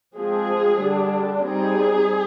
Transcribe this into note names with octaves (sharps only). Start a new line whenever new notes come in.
F3 G#3 C4 G#4
D3 G3 D4
G3 C4 D#4 G#4